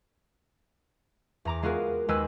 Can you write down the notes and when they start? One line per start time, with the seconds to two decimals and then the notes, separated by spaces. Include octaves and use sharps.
1.45 E2 A#5 D6
1.62 G#3 B3 F4 F#4 G#4 A#4
2.08 D#2 G#3 B4 G#5 E6 G6